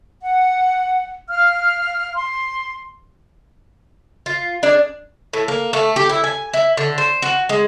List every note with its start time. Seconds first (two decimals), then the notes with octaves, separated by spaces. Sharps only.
0.21 F#5
1.29 F5 F6
2.14 C6
4.26 F4
4.63 D4 G#4 D5
5.33 A2
5.48 A#3
5.73 A3
5.96 G4
6.09 E4
6.24 G#5
6.53 E4
6.77 D3
6.98 C5
7.22 F#4
7.49 G#3